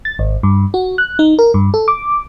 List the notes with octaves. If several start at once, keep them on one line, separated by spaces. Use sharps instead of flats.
A6
G#1
G2
F#4
F#6
D#4
A#4
G2
A4
D6